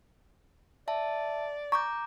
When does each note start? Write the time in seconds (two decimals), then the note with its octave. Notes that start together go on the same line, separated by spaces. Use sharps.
0.88 D5 E5 A5
1.72 A#5 C#6 D6 G6